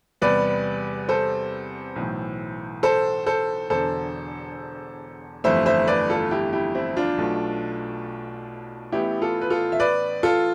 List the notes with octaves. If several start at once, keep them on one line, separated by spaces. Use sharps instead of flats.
E2 C3 G3 B3 B4 D5
A4 C5
B1 A2 E3
A4 C5
A4 C5
E1 E2 D3 A4 C5
G1 F2 E3 A3 C5 E5
C5 E5
B4 D5
F4 A4
E4 G4
E4 G4
C4 E4
D4 F4
B1 B2 A3
A1 A2 E3 B3 E4 G4
F4 A4
B4
F4 A4
E5
B4 D5
F4 A4